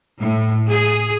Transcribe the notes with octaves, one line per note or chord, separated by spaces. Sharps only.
A2
G#4